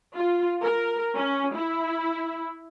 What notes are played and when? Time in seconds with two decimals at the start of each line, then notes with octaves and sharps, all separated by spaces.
0.15 F4
0.62 A#4
1.15 C#4
1.55 E4